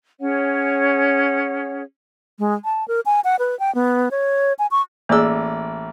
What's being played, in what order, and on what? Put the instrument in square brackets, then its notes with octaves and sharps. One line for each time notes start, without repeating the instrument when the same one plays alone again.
[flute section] C#4 G#4 C#5 F#5
[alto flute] G#3
A5
A#4
G#5
F#5
B4
G5
B3
C#5
G#5
C#6
[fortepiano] A1 D5 E6 [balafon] A#3 G#4